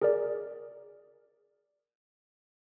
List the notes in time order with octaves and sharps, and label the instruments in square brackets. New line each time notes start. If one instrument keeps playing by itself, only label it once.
[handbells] G#4 A#4 D5